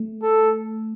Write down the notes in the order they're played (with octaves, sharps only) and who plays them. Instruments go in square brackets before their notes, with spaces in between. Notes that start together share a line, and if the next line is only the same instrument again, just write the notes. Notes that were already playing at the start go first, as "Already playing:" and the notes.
Already playing: [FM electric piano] A3
[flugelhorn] A4